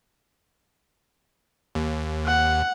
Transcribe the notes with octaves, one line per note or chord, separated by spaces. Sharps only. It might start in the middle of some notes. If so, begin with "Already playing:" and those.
D#2
F#5